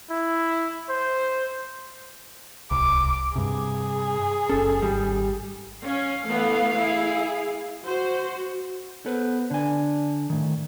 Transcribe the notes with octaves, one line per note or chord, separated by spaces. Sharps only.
E4
C5
D1 C2 D6
G2 C3 G#4
F#1 C#4 A4
G#1 G3
C#4 F5
E3 A3 B3
E4 G#4
F#4 C5
B3 A4 B4 C5
D3 D4 G#5
A2 D#3